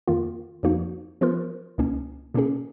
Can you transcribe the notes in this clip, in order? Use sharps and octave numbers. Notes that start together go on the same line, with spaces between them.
F2 D#3 A#3 F4
F2 F3 A#3 D#4 F#4
F3 B3 F4 A#4
C#2 B2 A#3 C#4
B2 A#3 C#4 G#4